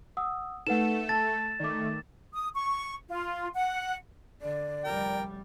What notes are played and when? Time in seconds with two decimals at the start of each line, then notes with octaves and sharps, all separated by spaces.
0.17 F#5 D#6 E6
0.67 A3 D#4 A4 B4 F#5 E7
1.09 A5 A6
1.60 D#3 A3 D5 D6
2.35 D#6
2.55 C#6
3.10 F4
3.55 F#5
4.42 D3 D5
4.84 F1 G3 A#4 G5